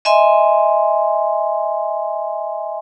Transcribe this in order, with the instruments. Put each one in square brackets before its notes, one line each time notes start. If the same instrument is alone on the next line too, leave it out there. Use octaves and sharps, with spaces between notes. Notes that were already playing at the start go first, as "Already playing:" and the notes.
[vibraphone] D#5 E5 G#5 C6